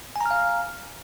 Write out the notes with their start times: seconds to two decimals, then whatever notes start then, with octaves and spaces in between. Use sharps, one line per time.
0.16 G#5
0.21 A#5
0.26 F6
0.31 F5